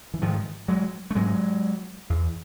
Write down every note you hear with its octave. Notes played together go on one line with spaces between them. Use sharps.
E3
G#2 D#3 F3
F#3 G#3
A3
G#2 F#3 G#3
E2